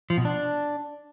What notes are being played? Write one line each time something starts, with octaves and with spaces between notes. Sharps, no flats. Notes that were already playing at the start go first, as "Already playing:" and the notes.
F3
B2
D4